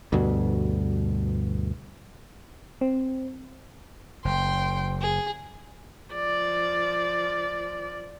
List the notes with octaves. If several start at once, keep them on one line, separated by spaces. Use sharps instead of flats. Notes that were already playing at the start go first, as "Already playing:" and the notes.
D2 G2 B2
C4
F#1 G5 C6
G#4
F3 D5